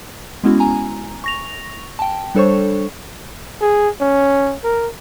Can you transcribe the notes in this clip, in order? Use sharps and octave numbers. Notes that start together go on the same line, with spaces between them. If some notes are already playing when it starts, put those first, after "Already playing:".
G#3 B3 C#4 E4 F#4
G#5 A#5
C#6 A#6 F7
G5 A5
G3 D4 A4 C5 C#5 C#6
G#4
C#4
A#4